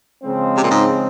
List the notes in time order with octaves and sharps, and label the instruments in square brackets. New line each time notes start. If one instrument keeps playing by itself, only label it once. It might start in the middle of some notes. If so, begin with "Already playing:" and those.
[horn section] C#3 F3 G#3 C4
[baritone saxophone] C3
A#2
G#2